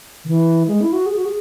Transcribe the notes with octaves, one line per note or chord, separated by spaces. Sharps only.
D#3
E3
G#3
E4
F#4
G#4
F#4
G#4